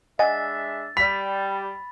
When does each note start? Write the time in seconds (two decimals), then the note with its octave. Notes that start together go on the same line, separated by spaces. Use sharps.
0.19 G#3 D4 D#5 E5 F#5 G#5 A6
0.97 G3 B5 B6